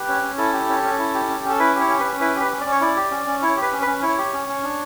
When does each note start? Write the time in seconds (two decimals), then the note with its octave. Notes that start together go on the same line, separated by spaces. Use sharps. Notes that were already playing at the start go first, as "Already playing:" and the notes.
Already playing: G4 B4
0.08 C#4
0.23 C#4
0.38 E4 A4
0.53 G4
0.69 C#4
0.84 C#4
0.99 E4
1.14 G4
1.30 C#4
1.44 C#4 A4
1.59 E4 B4
1.75 G4
1.80 C#5
1.90 C#4
2.00 B4
2.05 C#4
2.20 E4 B4
2.36 G4 B4
2.51 C#4
2.61 D5
2.66 C#4
2.72 C#5
2.81 E4 D5
2.96 G4
3.11 C#4
3.27 C#4
3.42 E4 C#5
3.57 G4
3.62 B4
3.72 C#4
3.82 B4
3.87 C#4
4.02 E4 C#5
4.18 G4
4.33 C#4
4.48 C#4
4.63 D4